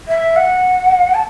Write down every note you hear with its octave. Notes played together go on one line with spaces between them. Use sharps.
E5
F#5
A5